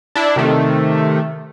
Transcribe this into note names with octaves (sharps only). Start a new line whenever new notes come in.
D4 E4
C3 D#3 A3